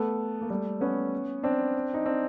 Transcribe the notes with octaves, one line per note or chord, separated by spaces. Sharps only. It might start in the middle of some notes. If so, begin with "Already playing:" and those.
Already playing: A3 B3
A#3
G3 A3
B3 C#4
C4 D4
D#4
C4 D4